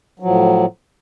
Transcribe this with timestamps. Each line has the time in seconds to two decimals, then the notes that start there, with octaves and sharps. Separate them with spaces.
0.20 F#3
0.22 F3
0.25 A2